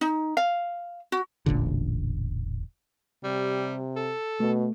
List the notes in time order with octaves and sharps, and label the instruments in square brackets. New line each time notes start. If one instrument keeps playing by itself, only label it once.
[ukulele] D#4
F5
F#4
[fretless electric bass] E1 A1 A#2 D3
[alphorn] C3 [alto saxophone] G3
[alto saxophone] A4
[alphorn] B2 [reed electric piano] A3